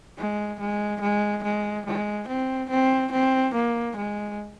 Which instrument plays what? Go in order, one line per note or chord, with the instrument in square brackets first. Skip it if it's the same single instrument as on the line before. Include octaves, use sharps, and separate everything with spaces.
[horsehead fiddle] G#3
G#3
G#3
G#3
G#3
C4
C4
C4
A#3
G#3